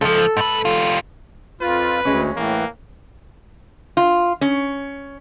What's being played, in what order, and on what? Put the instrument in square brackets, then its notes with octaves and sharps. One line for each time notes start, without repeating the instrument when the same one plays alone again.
[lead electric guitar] C#2 F3 [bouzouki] A4
[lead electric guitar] G#2 B4
G3 F4
[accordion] F2 F4 [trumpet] B4
[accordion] D2 [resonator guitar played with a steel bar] G#3 C#4
[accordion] A2 E3 [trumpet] A#3
[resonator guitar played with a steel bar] F4
C#4